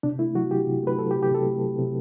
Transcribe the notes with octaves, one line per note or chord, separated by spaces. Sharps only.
C3 D4
A3 E4
F#3 F#4
C3 G4
C3
A3 B4
F#3 A4
G4
C3
G4
C3 A4
A3
F#3
C3